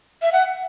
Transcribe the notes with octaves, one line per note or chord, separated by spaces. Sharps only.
E5
F#5